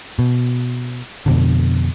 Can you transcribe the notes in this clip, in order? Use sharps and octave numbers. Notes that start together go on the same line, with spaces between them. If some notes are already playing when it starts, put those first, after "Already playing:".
B2
F2 B2 D3